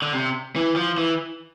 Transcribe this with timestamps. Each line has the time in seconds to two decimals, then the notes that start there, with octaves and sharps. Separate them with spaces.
0.02 D3
0.13 C3
0.56 E3
0.76 F3
0.98 E3